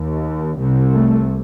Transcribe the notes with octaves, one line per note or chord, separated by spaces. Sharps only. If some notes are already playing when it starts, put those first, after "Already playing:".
Already playing: D#2
C2 C3
A3